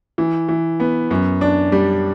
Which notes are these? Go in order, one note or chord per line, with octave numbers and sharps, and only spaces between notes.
E3
E3
B3
F#2
D4
G3